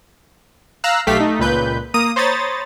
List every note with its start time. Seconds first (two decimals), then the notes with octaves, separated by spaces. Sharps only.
0.84 F5 A#5 E6 F#6
1.07 B1 A3 G4 F5 B6
1.19 A3 D#4
1.39 C#2 A#2 B4 G6
1.94 A#3 A#5 D#6 D#7
2.16 C5 C#5 A#5 B5 D#6 A6